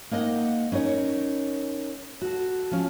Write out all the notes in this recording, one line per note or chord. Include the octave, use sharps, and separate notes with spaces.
A#3 D#4 D#5 F#5 G5
C#4 D#4 A#4 C#5
F#4 A4
F3 C#4